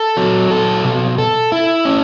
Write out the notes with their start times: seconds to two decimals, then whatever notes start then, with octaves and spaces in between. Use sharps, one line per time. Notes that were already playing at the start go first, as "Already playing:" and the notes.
Already playing: A4
0.17 F#3
0.51 A4
0.84 B2
1.18 A4
1.52 E4
1.85 C#4